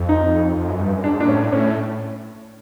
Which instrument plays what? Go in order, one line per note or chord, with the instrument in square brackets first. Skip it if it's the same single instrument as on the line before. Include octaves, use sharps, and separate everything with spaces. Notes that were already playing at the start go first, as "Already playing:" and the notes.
Already playing: [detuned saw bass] F2
[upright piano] D#4
[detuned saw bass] F2
F#2
G2
F#2
[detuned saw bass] G#2 [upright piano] D4
[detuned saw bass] A#2 [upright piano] D4
[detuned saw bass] A2 [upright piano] C#4
[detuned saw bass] A2 [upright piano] C#4